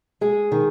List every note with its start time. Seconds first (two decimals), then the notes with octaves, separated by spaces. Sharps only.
0.21 G#3 G#4
0.52 D#3